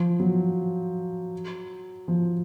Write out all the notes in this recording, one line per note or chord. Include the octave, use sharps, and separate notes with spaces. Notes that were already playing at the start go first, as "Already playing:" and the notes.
Already playing: F3
F#3
F3